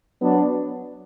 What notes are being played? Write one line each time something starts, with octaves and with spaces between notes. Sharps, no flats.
F#3 B3 D4